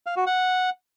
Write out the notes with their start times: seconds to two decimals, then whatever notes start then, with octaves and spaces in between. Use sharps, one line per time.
0.06 F5
0.16 F#4
0.26 F#5